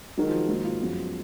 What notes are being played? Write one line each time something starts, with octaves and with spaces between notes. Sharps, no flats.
D#3 F#3 G#3 D#4 F#4 A#4
F3
G#2 D#3 F#3 A#3
F4
F#2 F3 G#3 B3 F#4